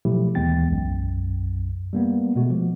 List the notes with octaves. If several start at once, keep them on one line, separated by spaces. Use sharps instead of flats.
B2 F3 F#3 A3 E4 G4
D#2 E3 G#3 B3 G5 A6
B1 F#2
G3 A#3 B3
B2 G#3 A3 B3 F#4
F3